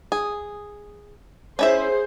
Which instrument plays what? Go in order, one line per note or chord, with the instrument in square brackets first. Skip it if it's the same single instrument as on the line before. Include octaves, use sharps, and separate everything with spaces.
[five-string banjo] G#4
[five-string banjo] C#4 E4 E5 [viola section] G#4 C5